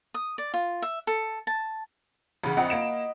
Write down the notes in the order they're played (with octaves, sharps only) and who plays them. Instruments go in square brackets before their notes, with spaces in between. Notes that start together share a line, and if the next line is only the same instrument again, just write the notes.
[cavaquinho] D#6
D5
F4
E5
A4
A5
[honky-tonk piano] A1 C#3 [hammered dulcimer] F#5 B5
[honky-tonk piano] A#1 C4 F#5 [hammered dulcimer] D#5
[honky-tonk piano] A#3 D7 E7